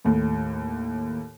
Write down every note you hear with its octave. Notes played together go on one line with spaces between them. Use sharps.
D#2 A2